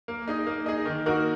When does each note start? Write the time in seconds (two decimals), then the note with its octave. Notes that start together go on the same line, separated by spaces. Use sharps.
0.08 A#3
0.27 D#4 G#4 D#5
0.47 A#3
0.66 D#4 G#4 D#5
0.86 D#3
1.06 A#3 D#4 F#4 A#4